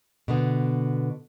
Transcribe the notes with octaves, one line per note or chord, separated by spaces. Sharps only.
B2 D3 B3